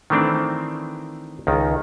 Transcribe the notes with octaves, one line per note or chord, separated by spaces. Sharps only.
D#3 E3 A3 C4 D4
C#2 D#3